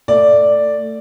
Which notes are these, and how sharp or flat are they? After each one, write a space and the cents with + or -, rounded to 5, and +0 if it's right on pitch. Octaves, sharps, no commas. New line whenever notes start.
A3 +25 D5 +0